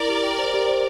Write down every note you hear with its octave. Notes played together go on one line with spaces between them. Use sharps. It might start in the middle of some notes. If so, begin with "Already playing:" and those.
Already playing: E4 A#4 D5
G4
G5
C5
G4
C5